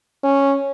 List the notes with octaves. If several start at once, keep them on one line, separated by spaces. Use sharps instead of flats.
C#4